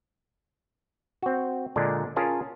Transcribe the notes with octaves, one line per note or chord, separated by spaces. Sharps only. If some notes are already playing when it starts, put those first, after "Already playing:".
C4 F#4
A#2 D3 G#3 D4
C#4 F4 G#4 A#4 A5 A#5